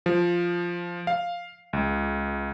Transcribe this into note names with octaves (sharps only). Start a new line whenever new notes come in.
F3
F5
C#2